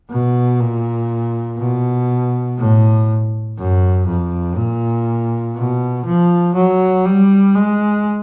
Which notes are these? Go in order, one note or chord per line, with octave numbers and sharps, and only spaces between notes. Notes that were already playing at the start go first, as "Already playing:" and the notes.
B2
A#2
B2
A2
F#2
F2
A#2
B2
F3
F#3
G3
G#3